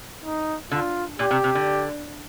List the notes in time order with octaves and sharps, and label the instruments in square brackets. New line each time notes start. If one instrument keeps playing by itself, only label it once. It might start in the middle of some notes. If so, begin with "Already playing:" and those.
[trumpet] D#4
[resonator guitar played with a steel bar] D3 [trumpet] F4
[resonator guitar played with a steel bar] A#2 [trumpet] G4
[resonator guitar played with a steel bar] C3
C3
D3